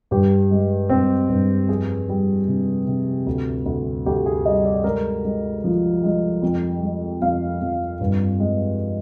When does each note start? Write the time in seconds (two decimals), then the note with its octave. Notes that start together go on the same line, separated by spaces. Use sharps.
0.11 G2 G4
0.51 G#3
0.89 G2 C4
1.29 G2
1.68 F2 G#4
2.09 G3
2.48 C3
2.87 C3
3.26 D2
3.66 D2
4.06 D2 G4
4.26 G#4
4.46 G3 D#5
4.65 D5
4.84 G#3 A#4
5.25 G#3
5.64 F3
6.03 G#3
6.42 F2
6.82 G#3
7.22 F2 F5
7.61 F2
8.01 G2
8.40 G#3